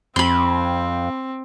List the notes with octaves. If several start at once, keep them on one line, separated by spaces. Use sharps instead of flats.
F2 C4 B5 C6